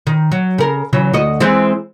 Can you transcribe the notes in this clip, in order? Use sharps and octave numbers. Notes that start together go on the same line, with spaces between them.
D#3
F#3
C#3 A#4
C#3 E3 F#3
D2 F#4 D#5
E3 G#3 C4